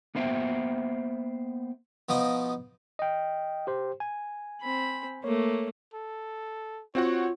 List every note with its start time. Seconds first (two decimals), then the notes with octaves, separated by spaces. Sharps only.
0.15 A#3 B3 C5 E5 G5
2.09 B2 F3 D#4 D#5
2.99 D#5 G5
3.67 G4 C5
4.00 G#5
4.62 C4 B5
5.24 A3 A#3 C#5
5.94 A4
6.95 C4 F4 F#4 C#5 F#5